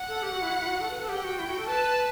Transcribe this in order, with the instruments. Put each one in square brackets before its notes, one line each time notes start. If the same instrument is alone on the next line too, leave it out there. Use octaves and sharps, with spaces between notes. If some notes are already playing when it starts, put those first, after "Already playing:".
Already playing: [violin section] F#5
[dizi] A4
G4
F#4
E4
F#4
E4
F#4
A4
B4
A4
[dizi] G4 [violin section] G5
[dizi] F#4
E4
F#4
A4
[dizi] B4 [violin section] A5